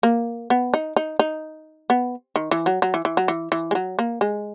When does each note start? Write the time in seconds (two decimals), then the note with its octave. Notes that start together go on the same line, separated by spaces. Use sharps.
0.03 A#3
0.50 B3
0.74 D#4
0.96 D#4
1.19 D#4
1.90 B3
2.36 D#3
2.51 E3
2.66 F#3
2.82 F#3
2.94 E3
3.05 E3
3.17 F#3
3.28 E3
3.52 E3
3.71 G#3
3.75 F#3
3.99 A#3
4.21 G#3